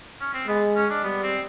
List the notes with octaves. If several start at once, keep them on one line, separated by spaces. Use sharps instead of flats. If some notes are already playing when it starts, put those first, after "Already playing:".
C#4
C4
G#3 B3
C#4
D4
G3 B3
C4